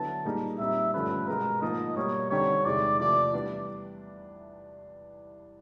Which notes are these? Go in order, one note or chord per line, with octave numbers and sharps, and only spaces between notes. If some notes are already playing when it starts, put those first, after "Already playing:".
Already playing: D3 F#3 B3 E4 A5
A#2 G3 A#3 D#4 G#4
A#2 G3 C4 D#4 E5
G2 D3 F3 A3 C#4 B4
B2 G#3 B3 A#4
G#2 F3 A#3 D#5
B2 G3 A#3 C#5
D3 G3 C4 D#4 G4 C#5
E2 C3 D#3 G#3 D5
E2 C3 F3 A3 D5
E3 G3 B3 D4